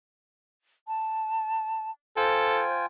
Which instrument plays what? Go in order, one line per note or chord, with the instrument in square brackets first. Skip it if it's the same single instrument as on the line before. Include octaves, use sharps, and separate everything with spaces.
[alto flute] A5
[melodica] F4 G5 G#5 [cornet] A4 [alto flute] C5